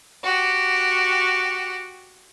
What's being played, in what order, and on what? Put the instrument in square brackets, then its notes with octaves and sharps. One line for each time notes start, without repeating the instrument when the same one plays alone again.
[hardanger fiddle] F#4 G4